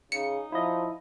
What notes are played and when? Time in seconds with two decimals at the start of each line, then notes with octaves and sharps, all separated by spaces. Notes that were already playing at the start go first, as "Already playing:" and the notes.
0.12 C#3 D#4 C#7
0.52 F3 E4 D#5